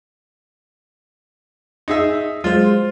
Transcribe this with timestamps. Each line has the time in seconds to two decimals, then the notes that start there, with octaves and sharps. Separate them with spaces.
1.88 D#4 G#4 E5
2.44 F#3 G#3 F4 C5